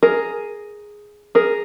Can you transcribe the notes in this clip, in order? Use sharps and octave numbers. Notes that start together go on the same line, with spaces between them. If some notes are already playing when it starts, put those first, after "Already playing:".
G#4 A#4
G#4 A#4